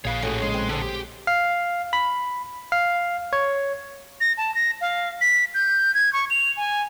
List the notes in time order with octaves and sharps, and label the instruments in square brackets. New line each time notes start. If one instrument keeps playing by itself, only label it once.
[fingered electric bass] A#1 [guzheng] G#4 B4 [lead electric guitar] C#5 F5
[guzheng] A2 C#4 D#5 [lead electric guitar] F#4 G#4
[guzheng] C#3 [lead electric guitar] G#3
[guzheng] C4 B4
[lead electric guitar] D3 [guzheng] C4 G#4
[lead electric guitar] G4
[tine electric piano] F5
B5
F5
C#5
[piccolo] A#6
A5
A#6
F5
B6
G6
G#6
C#6
F7
G#5